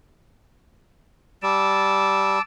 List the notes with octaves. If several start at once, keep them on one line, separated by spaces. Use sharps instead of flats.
G3 A5 D6 E6